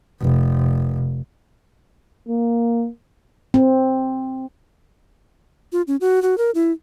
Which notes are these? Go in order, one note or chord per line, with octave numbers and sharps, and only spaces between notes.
F1
A#3
C4
F4
C#4
F#4
F#4
A#4
E4